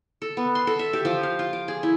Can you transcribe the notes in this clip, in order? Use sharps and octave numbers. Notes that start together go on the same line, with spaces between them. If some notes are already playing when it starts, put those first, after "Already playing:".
A4
B3
C6
A4
E5
G4
F3
F5
F4
D6
G#4
E4